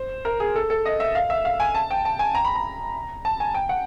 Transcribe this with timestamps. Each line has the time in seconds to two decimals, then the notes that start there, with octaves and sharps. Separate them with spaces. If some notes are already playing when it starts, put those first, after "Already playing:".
Already playing: C5
0.25 A#4
0.40 G#4
0.56 A4
0.70 A4
0.85 D#5
1.00 E5
1.15 F5
1.30 E5
1.45 F5
1.60 G#5
1.75 A5
1.91 G5
2.05 A5
2.19 G#5
2.35 A#5
2.45 B5
2.55 A#5
3.25 A5
3.40 G#5
3.54 G5
3.69 F#5